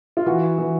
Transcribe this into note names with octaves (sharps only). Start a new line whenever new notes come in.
F4
E3 F#4
E3